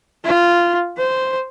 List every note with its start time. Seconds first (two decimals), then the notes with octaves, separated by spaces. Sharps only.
0.25 F4
0.98 C5